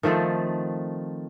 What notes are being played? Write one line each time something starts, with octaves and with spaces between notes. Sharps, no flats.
D#3 F3 A3 C4